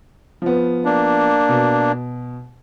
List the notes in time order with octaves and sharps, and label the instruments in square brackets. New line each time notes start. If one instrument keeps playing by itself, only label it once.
[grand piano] F3 B3
[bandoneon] A#3 D4
[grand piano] B2